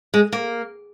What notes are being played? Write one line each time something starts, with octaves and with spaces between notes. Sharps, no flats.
G#3
A#3